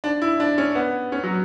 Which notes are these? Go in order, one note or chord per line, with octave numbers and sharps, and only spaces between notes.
D4
E4
D4
C#4
B3
C#4
F#3